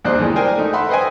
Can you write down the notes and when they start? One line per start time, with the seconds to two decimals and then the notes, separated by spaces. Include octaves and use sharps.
0.04 A#1 D#2 D4 C5 F#6
0.18 G2 E3 G#3
0.35 D4 A#4 C5 G5 G#5
0.58 A3 D#4
0.73 A4 E5 F#5 B5 C6
0.89 B4 C5 D#5 G5 G#5